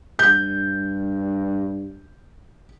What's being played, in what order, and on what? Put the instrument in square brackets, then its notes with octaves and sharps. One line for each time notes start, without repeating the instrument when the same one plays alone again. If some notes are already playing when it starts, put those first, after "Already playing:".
[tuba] G2 [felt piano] G6